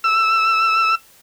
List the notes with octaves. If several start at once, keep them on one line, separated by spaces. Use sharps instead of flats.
E6